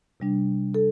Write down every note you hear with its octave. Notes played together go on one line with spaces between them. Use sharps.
C3 G3 D4
A4